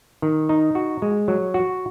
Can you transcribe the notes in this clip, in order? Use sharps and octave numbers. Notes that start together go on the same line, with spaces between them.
D#3
D#4
F#4
G#3
F#3
F#4